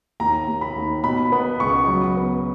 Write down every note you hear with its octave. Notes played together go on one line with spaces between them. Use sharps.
D#2 A#5
D#2
B5
D#2
B2 B5
B3 B5
C#2 C#6
F#3
B3